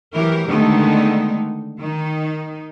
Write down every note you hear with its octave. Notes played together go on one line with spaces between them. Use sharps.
E3 F#3 G4 A#4
D3 D#3 G#3 A3 B3 D#4
D#3 D#4